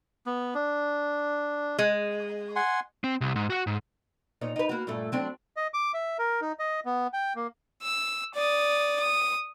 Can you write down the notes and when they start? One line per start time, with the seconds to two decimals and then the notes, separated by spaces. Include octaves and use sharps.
0.26 B3
0.54 D4
1.79 G#3
2.56 F#5 G#5 C6
3.04 C4
3.21 C2
3.36 G#2
3.50 F#4 F#5
3.67 G#2
4.41 A#2 D#4 C#5
4.56 D#4 B4
4.69 A#3 F#4
4.87 G2 A#2 A3
5.12 F#3 C4 D4
5.57 D#5
5.74 D6
5.94 E5
6.19 A#4
6.42 D#4
6.59 D#5
6.86 B3
7.13 G5
7.36 A#3
7.82 E6
8.34 D5 D#6
9.00 D#6